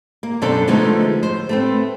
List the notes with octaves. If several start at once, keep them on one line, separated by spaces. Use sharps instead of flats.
A#3
F#2 B2 D3 D4 A4 C5
D3 F3 G#3 A3 B3 D#4
C5
A3 B3 C4